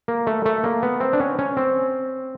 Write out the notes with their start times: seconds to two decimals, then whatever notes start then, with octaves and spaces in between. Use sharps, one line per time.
0.08 A#3
0.27 A3
0.46 A3
0.64 A#3
0.83 B3
1.00 C4
1.13 D4
1.20 C#4
1.39 C#4
1.57 C4